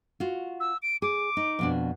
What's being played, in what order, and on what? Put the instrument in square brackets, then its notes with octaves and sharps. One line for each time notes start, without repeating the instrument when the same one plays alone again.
[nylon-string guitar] F4 F#4
[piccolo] E6
D7
[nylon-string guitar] G#4 [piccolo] D6
[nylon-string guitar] D#4
F2 B2 D4